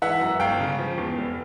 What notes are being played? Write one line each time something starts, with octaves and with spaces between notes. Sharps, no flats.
E3 E5 F#5
F#2
G1 F5 G5
C#3
F3
E2
F1